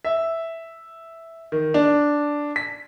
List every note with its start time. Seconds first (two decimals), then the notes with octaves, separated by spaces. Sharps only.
0.05 E5
1.52 D#3
1.74 D4
2.56 B6